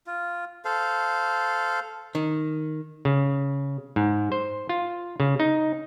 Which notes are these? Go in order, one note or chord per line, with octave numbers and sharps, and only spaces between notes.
F4
A4 C5 F5
D#3
C#3
G#2
C5
F4
C#3
D#4